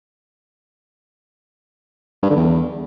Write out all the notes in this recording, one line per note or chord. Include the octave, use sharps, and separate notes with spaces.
G2
D3
E2